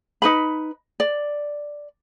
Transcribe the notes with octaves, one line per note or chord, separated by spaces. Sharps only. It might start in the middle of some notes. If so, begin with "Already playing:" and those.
D#4 B4 B5
D5